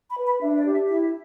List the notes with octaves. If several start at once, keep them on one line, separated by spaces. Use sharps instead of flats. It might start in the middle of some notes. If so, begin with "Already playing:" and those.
B5
B4
B5
D4 E5
D5
G4
E5
E4 E5